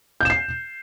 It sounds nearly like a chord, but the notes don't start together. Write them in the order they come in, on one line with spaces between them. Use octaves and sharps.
G6 E7 C7